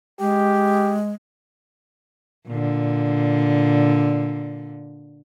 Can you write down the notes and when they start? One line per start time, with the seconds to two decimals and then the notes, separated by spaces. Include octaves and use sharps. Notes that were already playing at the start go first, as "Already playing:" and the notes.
0.20 G#3 G4
2.48 A#2 D3